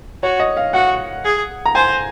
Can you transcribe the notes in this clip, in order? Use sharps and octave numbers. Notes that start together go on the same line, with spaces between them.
F#4 C#5
D#5
F5
F#4 F#5
G#4
A#5
C5 G#5